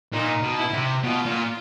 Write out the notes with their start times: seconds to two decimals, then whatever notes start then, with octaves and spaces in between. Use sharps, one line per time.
0.12 A#2 D#4
0.43 B2
0.58 E4
0.74 C3
1.04 B2 F4
1.26 A#2